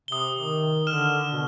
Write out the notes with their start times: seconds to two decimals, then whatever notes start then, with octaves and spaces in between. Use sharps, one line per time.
0.08 C3 D#6 G7
0.36 D#3
0.87 D3 F6 E7
1.31 B2